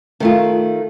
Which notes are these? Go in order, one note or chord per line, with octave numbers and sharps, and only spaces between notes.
D#3 A3 F4